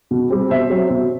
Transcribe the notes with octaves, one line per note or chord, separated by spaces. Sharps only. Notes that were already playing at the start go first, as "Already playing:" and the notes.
B2
G3 C4
B2 C5 E5
F#3 C4
B2